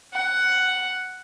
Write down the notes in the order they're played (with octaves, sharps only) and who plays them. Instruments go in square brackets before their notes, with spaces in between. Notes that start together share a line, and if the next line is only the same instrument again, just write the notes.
[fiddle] F#5